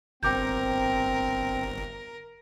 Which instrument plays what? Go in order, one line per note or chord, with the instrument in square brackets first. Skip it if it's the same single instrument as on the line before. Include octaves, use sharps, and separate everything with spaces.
[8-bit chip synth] G1 [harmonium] C4 [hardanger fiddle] A#4 [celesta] G5 D6 G6